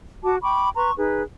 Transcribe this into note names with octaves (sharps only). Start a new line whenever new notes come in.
F#4 A5 D6
G5 B5 C#6 D6
B4 A#5 C6 C#6
D#4 G#4 B4